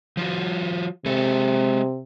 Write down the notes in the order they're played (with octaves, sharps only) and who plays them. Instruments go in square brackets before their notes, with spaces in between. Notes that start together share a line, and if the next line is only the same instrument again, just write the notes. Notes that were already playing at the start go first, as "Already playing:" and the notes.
[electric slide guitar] F3 F4 F#4
[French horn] C3 [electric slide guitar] G#3 A4